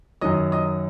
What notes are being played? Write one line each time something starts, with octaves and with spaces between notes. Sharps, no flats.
F#2 D#3 F#3 D#5 D#6
D#5 D#6